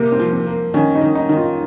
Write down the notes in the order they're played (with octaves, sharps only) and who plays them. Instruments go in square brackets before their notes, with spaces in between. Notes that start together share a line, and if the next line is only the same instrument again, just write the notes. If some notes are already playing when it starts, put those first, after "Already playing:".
Already playing: [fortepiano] C3 [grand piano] A#3
[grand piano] C4
[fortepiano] F3
[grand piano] C4
[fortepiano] A#3
[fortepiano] D#3 [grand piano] C#4
[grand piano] D#4
[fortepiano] D#3
[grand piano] D#4
[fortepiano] D#3
[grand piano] F4